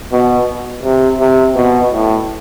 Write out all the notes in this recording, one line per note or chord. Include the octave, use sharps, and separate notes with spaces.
B2
C3
C3
B2
A2